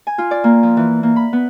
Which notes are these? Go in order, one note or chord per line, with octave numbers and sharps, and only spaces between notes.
G#5
F4
D5
A#3
F3
E3
A#3
B5
B3